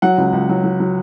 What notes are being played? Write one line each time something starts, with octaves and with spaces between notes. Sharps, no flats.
F#3 F#5
C#2
C#2
F#3
F#3
F#3